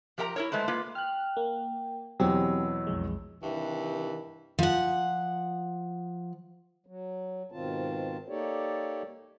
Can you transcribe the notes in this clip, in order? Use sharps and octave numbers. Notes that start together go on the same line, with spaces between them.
F3 G4 A#4 F5 A#5
E4 A#4 C#5
G#3 A3 B4 C5
A#3 F4 B4
G5 F6 F#6
A#3
E2 B2 F#3 C4 G4 E6
B1 F2 G#3
G2 C3 D#3 E3
F3 F#5
F#3
G#2 B2 D#3 C4 F4 A5
A#3 D#4 G4 A4 C#5 D5